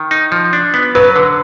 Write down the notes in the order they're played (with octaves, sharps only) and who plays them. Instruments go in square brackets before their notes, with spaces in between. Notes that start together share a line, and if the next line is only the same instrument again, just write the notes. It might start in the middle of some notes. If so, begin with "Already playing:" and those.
Already playing: [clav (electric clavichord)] D#3
D#4
F3
D4
B3
[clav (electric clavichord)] F#3 [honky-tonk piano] B4
[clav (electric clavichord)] D3